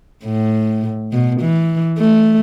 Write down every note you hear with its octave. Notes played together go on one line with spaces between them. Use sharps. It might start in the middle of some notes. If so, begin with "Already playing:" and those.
A2
B2
E3
A3